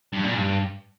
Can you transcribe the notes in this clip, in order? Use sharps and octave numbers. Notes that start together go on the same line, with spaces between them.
G2
A#2
G2